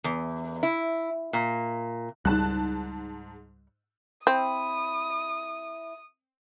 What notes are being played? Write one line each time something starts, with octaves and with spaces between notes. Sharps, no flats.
E2
E4
A#2
C#2 G#2 G3 A5 F#6
C4 E4 D#6